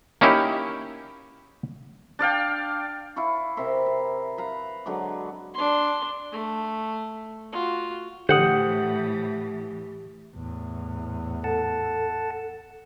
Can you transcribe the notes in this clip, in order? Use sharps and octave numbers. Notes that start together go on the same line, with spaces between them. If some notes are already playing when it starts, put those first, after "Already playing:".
A#3 C#4 D#4 E4 G4
D4 D5 F5 G5
E4 F5 C#6 D6
C3 A#4 E5 C6
E5
B4 F5 A#5
D3 F#3 G#3 D6
D4 C6
A3
F4 F#4
A2 D3 E3 G4 C5 F#5 D#6
E2 A2
A4 F#5 A5